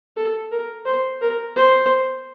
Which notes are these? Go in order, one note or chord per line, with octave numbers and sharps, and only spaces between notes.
A4
A#4
C5
A#4
C5